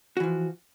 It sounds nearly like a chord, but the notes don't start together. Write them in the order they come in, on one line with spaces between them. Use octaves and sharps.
F#4 E3 F3